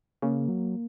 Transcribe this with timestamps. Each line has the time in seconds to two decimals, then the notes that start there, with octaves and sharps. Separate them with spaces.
0.22 C#3 A#3
0.48 F#3